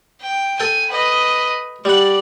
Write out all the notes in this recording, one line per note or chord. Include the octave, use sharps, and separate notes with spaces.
G5
A4 G5 G#5
B4 D#5
G3 D5 F#5